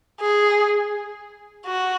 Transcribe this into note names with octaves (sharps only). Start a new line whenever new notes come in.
G#4
F#4